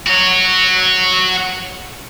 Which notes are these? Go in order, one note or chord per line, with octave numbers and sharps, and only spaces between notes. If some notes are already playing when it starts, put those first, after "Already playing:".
F#4 C#5